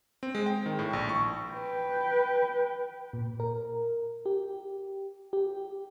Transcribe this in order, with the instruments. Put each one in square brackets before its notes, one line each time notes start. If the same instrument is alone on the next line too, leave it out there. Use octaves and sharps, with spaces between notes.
[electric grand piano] C4
G#3
G5
D#3
A2
A#1
C#6
[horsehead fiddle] B4 G5
[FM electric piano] A#2
A#4
G4
G4